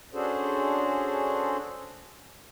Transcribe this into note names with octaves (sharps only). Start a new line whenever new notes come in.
C#4 D4 F#4 G#4 A4 C5